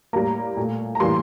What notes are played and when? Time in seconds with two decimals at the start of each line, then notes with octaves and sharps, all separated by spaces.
0.13 A2 G3 A#3 A#5
0.57 A#2 A3
0.95 A#5
1.00 A2 E3 G3 A#3 C6